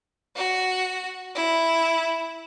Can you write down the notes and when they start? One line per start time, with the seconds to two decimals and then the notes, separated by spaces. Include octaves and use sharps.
0.36 F#4
1.36 E4